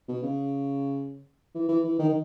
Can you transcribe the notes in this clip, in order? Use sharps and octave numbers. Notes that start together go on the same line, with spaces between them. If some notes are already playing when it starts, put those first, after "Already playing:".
B2
C#3
E3
E3
E3
D#3
D#3